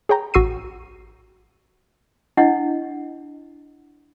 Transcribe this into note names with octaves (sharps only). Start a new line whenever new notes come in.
G#4 C#5 G5 A#5
A1 F#4 C#6 E6 C7 D#7
D4 E4 D#5 F#5